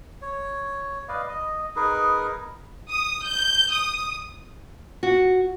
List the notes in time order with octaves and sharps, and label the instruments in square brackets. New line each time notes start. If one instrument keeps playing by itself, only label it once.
[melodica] C#5
B4 D5 D#5 F5
D#5
D#4 G#4 A#4 B4
[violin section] D#6
G6
D#6
[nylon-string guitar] F#4